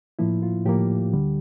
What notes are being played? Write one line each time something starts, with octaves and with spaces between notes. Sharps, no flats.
A2 F3 A#3 E4
F4
A2 F3 A#3 G4
D2 D3 G3